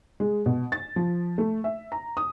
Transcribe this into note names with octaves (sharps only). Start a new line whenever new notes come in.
G#3
B2
A6
F3
A3
E5
A#5
D#6